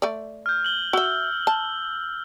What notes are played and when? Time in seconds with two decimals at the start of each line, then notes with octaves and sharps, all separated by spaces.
0.02 A3 D5
0.46 F6 G6
0.65 F#7 G7
0.93 F#4 E5 E6 G7
1.47 A5